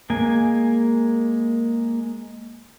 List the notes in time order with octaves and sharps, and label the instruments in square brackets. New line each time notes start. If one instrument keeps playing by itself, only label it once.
[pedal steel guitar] G#3 A#3 G#5